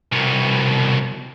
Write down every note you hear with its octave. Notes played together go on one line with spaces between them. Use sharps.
C2 B2